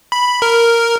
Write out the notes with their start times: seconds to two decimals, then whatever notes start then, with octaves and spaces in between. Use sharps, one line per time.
0.12 B5
0.42 A#4